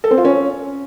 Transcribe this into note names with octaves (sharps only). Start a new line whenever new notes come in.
A4
C4
F4
C#4